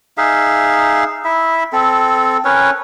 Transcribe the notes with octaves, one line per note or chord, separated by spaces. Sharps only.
D#4 G#4 E5 F5
E4 E5
C4 A4
C#4 A#4 B4 C#5